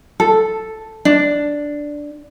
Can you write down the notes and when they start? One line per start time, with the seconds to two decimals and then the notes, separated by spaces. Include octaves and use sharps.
0.20 A4
1.05 D4